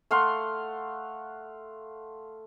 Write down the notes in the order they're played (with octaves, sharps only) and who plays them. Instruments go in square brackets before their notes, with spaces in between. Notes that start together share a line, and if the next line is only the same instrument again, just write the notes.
[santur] A3 F5 F#5 C6